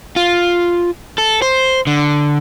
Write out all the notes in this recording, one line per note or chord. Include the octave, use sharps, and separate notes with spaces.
F4
A4
C5
D3